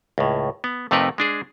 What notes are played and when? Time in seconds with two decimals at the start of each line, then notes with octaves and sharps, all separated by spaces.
0.18 C#2 A2
0.64 B3
0.91 F2 C3 A3 D#4 A#4 B4
1.18 G#3 D4 G#4